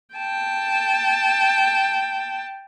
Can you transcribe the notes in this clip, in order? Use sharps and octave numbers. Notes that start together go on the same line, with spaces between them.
G5 A5